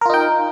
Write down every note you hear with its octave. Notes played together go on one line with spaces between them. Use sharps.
D#4 F4 A#4 G5